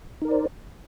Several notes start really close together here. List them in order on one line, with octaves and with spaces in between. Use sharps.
D#4 A#4 D5 C5